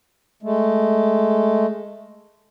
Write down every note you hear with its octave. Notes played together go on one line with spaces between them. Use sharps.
G#3 A3